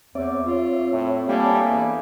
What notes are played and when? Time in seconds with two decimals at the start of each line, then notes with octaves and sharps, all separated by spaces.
0.15 E2 C4 C#5 D5 E5
0.45 F4
0.93 A2
1.28 G3 A3 A#3 D4 G#4
1.69 E2